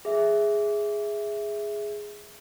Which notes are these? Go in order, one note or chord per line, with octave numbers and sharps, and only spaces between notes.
G#4 E5